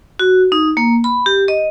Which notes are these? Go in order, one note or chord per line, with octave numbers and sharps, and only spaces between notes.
F#4
D#4
A#3
B5
G4
D#5